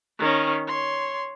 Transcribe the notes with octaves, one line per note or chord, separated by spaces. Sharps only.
D#3 C#4
C#5 C6